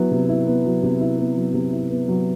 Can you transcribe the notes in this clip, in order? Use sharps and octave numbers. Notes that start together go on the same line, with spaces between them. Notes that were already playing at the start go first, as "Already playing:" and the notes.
Already playing: F#3 B3 E4
C3
E4
B3
F#3
C3
E4
B3
F#3
C3
E4
B3
F#3